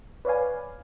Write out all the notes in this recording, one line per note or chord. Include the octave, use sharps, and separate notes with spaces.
B4 C#5 D5 F5 G#5